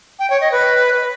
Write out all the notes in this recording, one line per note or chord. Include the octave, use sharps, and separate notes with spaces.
G5
C#5
D#5
B4